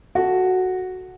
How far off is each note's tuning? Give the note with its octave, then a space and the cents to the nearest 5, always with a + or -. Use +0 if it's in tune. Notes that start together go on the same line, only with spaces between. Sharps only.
F#4 +0 A4 +0